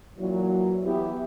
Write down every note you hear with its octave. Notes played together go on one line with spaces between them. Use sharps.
A#2 E3 F#3
E3 B3 E4 G4